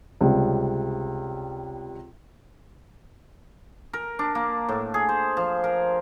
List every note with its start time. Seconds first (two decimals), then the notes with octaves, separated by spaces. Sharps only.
0.21 C#2 C3 G3
3.93 A#4
4.19 D4
4.35 A#3
4.69 A2
4.94 G#4
5.09 C5
5.37 F3
5.64 A#4